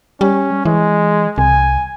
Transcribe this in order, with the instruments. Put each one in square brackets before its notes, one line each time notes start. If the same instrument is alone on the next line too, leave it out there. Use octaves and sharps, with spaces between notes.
[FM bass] G3 [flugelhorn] C#4
[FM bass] E3 [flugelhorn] G#3
[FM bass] C2 [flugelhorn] G#5